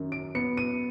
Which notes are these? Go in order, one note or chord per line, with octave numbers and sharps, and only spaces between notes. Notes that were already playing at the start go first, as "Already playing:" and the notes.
Already playing: F#2 D#3
D7
B3 C#7
D#7